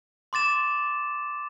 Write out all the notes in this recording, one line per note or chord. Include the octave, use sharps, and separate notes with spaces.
C6 D6 A6 E7